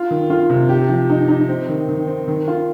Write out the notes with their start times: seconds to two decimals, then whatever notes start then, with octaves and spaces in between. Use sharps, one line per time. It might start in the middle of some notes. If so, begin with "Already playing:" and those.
Already playing: F4
0.11 D#3
0.30 F4
0.50 C3
0.69 G4
0.89 F3
1.09 D#4
1.28 D#4
1.48 C4
1.69 D#3
1.89 D#3
2.07 C4
2.28 D#3
2.48 F4